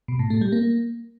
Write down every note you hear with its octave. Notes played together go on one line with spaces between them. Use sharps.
B2
A2
A3
G3
A#3